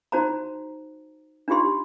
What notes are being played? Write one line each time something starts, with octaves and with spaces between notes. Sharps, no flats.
D#4 F#4 C5 A5 A#5
D4 D#4 F4 G4 C6